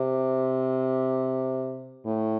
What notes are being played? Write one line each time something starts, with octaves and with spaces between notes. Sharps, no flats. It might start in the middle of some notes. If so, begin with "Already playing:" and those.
Already playing: C3
A2